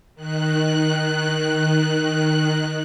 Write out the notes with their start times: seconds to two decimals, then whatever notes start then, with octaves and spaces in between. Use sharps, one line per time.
0.15 D#3 F#6